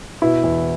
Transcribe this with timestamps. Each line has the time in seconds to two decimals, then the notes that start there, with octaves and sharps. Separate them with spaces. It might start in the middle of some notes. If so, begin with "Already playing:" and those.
0.22 B2 E4
0.44 E2